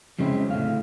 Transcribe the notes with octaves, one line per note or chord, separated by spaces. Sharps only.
F2 C#3 F#3 G#3 C4 E4
A2 D3 F5